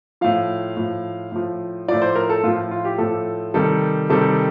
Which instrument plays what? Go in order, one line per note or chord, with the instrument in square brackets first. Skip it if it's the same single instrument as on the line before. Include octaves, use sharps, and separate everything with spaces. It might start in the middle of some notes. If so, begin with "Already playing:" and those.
[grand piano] A2 F3 F5
A2 F3
A2 F3
A2 F3 D5
C5
A#4
A4
A2 F3 F4
F4
G4
A2 F3 A4
C3 D#3 G3 A4
C3 D#3 G3 A4